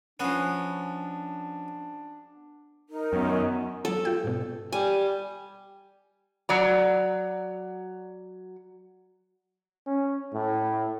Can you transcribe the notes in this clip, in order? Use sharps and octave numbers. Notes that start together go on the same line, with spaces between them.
F3 B3 C#4 D4 F#4 G#4
D#4 A#4
F#2 D#3 B3
F#3 B3 A4
F4 G5
G#2 B2
G3 G#5
F#3 D5 A#5
C#4
A2